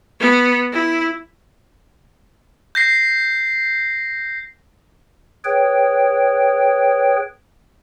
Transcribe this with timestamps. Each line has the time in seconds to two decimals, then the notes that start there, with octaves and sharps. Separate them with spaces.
0.20 B3
0.73 E4
2.75 G6 A#6 C7
5.44 G#4 B4 C#5 G5